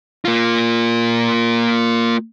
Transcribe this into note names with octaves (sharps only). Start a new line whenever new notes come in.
A#3 F4